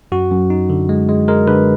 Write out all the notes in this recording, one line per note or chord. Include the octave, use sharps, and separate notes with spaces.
F#2 F#4
F#2
D#4
D3
G#3
G#3
G#3 A#4
D3 B4